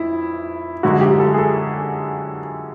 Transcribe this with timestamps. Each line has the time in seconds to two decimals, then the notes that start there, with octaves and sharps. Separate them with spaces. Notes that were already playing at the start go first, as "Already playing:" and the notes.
Already playing: F2 E4
0.83 F#2 D3 F3 G#3 F#4
1.01 G4
1.20 A4
1.34 G#4
1.38 A4